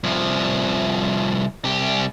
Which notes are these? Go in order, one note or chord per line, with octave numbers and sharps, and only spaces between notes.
C2 F3
C2 G4